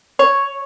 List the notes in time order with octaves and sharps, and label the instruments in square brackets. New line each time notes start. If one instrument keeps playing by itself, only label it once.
[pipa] C#5